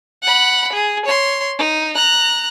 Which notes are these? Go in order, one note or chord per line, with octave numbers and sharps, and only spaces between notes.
F#5 B5
G#4
C#5 C6
D#4
A#5 F#6